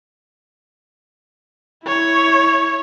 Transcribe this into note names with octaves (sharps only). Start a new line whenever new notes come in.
E4 C#5